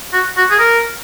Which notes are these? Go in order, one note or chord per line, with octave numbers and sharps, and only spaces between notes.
F#4
F#4
G#4
A#4